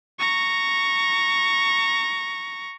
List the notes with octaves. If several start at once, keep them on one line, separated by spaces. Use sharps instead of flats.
A#5 C#6